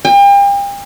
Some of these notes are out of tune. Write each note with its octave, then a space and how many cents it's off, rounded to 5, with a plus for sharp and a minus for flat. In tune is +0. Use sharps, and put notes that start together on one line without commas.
G5 +40